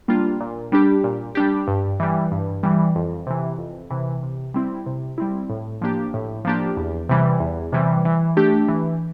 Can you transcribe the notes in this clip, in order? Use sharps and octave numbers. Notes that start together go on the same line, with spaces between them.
G3 A#3 D4 F4
A#2
G3 D4 G4
A#2
G3 D4 G4
G2
E3 G3
G2
E3 G3
F2
C3 E3
F2
C3 E3
C3
G3 C4 E4
C3
G3 C4 E4
A2
F3 A#3 D4 G4
A2
F3 A#3 D4 G4
E2
C3 E3 G3
E2
C3 E3 G3
E3
A3 D4 G4
E3